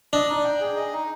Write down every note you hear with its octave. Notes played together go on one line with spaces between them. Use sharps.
D4 D#5
D#4
G5
G#4
D#5
D#4